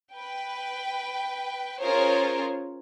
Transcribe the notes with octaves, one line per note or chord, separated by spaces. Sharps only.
B4 G5
C#4 F4 G#4 A#4 C5 C#5